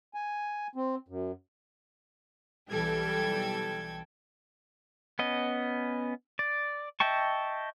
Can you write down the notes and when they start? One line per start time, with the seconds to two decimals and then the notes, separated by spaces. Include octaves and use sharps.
0.14 G#5
0.75 C4
1.08 F#2
2.71 B1 E3 G3 A4 G5 G#6
5.19 B3 C#4 D#5
6.39 D5
7.00 D#5 E5 G5 A5 C#6